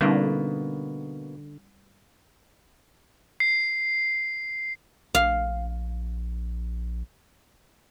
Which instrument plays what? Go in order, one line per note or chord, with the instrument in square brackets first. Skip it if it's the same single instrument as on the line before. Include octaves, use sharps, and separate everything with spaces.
[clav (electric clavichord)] B2 A#3 B3 [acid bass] D3 [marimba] G3 C#4 D#4
[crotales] C7
[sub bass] A#1 [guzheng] F5